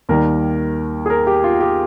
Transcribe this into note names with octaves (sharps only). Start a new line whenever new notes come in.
D#2 D#3 G3 A#4
G#4
A#4
G4
F4
G4